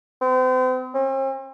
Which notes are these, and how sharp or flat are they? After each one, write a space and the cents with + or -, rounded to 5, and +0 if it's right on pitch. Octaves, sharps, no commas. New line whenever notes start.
C4 -40
C4 +45